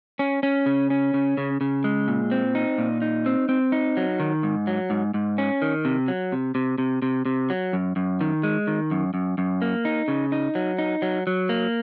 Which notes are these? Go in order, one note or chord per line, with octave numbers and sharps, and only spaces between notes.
C#4
C#4
C#3
C#4
C#3
C#3
C#3
G#3
A#2
C4
D#4
A#2
D#4
C4
C4
D#4
F#3
D#3
G#2
F#3
G#2
G#2
C#4
D#3
C3
F#3
C3
C3
C3
C3
C3
F#3
F#2
F#2
D#3
G#3
D#3
F#2
F#2
F#2
A#3
D#4
C#3
D#4
F#3
D#4
F#3
F#3
A#3